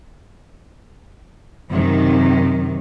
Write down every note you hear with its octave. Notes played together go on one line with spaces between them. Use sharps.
F#2 C3 D#3